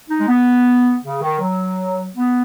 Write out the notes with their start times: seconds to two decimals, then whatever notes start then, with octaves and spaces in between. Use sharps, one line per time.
0.10 D#4
0.20 G#3
0.28 B3
1.04 C#3
1.22 D#3
1.40 F#3
2.16 B3